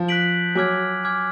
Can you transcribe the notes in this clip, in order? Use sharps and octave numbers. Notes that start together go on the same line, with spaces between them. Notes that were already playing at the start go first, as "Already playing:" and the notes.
Already playing: F3
F#6 B6 D7 F#7
F#3 G#5 D6 F6 G#6
G#5 D6 F6 G#6